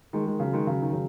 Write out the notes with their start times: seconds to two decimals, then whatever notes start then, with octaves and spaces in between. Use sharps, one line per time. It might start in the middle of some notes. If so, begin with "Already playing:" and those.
0.13 D#3 G#3
0.27 D#3 G#3
0.40 C#3 F#3
0.53 D#3 G#3
0.66 C#3 F#3
0.82 D#3
0.93 C#3 F#3